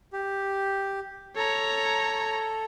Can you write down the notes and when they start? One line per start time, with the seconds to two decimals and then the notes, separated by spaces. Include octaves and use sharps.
0.13 G4
1.36 A4 C#5 A#5